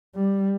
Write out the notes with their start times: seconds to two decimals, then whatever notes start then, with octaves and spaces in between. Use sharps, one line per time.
0.15 G3